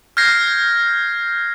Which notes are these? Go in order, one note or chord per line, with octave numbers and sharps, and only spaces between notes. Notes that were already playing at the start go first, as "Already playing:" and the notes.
F6 G6 G#6 A#6 C7